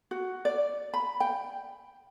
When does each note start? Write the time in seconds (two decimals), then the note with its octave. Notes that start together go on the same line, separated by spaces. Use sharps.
0.11 F#4
0.45 D5
0.94 B5
1.20 G5